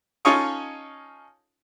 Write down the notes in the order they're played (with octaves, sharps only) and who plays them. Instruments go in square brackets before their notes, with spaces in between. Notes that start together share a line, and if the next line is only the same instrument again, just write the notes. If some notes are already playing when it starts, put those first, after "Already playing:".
[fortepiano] C#4 D#4 F4 A4 C#5 D#5